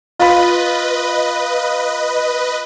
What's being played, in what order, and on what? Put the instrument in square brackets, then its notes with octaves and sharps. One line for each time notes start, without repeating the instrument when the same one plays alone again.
[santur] F4 B5 [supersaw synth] B4 D#5